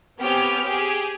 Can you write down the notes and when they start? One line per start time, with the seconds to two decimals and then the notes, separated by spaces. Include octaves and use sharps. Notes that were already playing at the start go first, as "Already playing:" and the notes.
0.19 B3 C4 G4 C#5 G#5 F6
0.64 G4 G#4 G#5